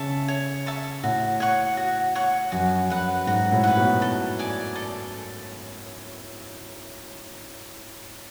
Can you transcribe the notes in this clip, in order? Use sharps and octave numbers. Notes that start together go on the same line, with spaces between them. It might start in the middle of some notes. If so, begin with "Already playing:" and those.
Already playing: C#3 E5 A5 C#6
C#5
E5 A5 C#6
A2 F#4
C#5 F#5 C#6
F#4
C#5 F#5 C#6
F#2 F#4
F#2 B4 F#5
G#2 F#4
A2
B4 F#5
B2
A4
D5 G#5 D6
A4